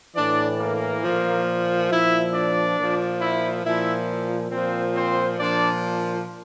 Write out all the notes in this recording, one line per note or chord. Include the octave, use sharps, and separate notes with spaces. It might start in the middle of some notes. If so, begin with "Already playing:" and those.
A2 E3 D4 D5
A#3 A#4
A#2 F3
A#2 F3 E4 E5
D4 D5
A#2 F3
E4 E5
A#2 F3 E4 E5
A#2 F3 C4 C5
C4 C5
A#2 F3 D4 D5